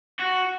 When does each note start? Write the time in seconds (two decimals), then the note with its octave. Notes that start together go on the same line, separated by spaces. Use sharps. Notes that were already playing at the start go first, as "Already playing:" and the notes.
0.20 F#4